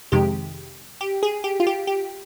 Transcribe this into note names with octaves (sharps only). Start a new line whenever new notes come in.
F2 C3 D#3 G#3 G4
G4
G#4
G4
F4
G4
G4